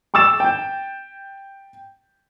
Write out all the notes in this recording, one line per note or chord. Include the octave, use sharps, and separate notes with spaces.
C#6 D6 E6 A6 E7
G5 G6